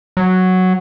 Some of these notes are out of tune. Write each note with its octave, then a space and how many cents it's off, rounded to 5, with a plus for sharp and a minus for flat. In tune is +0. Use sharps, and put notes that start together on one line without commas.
F#3 +0